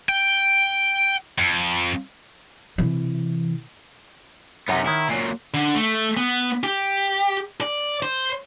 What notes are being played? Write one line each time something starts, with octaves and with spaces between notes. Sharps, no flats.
G5
F2
C3 E3
F#2 C3 B3 D#4
D#3 E4 C#5 F#5
A#2 F#3 G#5
D3
A3
B3
G4
D5
C5